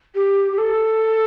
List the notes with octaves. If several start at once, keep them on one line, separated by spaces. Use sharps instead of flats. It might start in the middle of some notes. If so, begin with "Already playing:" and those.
G4
G4
A4